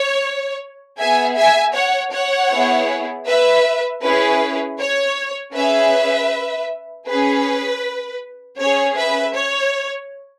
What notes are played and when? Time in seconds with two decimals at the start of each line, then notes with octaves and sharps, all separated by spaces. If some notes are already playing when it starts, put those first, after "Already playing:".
Already playing: C#5
0.98 B3 G#4 E5 G#5
1.37 E5 G#5
1.75 C#5 F#5
2.13 C#5 F#5
2.51 B3 E4 G#4
3.26 B4 E5
4.02 C#4 E4 G#4 B4
4.79 C#5
5.54 C#4 G#4 B4 E5
7.07 C#4 G#4 B4
8.58 C#4 G#4 C#5
8.97 B4 E5
9.35 C#5